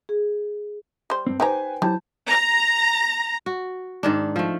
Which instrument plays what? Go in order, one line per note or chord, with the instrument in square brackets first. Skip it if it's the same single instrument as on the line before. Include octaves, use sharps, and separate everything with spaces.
[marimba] G#4
[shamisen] G3 C5
[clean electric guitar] G2 C4
[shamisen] D#4 G4 A#5 [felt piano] B4 C5 G#5 [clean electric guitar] G5
[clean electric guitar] F#3 E4 C5 [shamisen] G4 [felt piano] A5
[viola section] A#5
[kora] F#4
G#2 D#3 D4
F3 A3